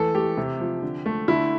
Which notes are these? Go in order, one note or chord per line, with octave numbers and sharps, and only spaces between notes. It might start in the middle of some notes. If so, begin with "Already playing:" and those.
Already playing: E3 A3 A4
A3 G4
C3
F3
D3
A3
D3 E4